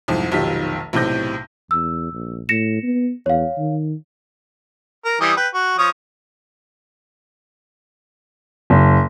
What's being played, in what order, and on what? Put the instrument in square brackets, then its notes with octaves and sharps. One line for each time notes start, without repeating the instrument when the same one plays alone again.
[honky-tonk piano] C2 F2 G#2
F1 B1 D#3 F4 G4 B6
B1 A2 C3 G6 A#6
[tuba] E2 [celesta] E6
[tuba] A#1
[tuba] A2 [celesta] A#6 C#7 E7
[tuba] B3
[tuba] E2 [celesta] C#5 F5
[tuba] D#3
[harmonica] A#4
E3 G3 D#6
B4 G5
F#4
F3 C#5 D#6
[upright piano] F#1